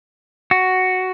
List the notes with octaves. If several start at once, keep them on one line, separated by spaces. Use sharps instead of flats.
F#4